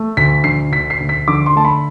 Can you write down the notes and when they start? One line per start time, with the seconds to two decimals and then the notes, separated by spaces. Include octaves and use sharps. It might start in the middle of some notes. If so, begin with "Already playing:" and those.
Already playing: A3
0.17 D2 B6
0.44 D3 C7
0.72 D2 B6
0.90 C7
1.00 D2
1.09 B6
1.28 D3 D6
1.46 C6
1.56 A3 A5
1.65 B5